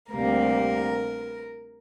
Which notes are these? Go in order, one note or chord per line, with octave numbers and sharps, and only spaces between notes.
D2 C3 G3 A#3 A#4